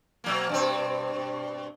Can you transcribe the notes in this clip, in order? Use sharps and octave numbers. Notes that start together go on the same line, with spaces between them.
B2 F#3 A#3
G2 B2 C4